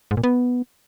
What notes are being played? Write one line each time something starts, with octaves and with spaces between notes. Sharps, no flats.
G#2
A#2
B3